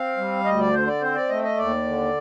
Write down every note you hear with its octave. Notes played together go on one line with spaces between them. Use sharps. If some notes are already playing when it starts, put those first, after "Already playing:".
Already playing: C4 F5
G3
D2 D#5
D5
D3 C5
D5
C4 C5
D5
A3 D#5
D#5
D#2 D5
D3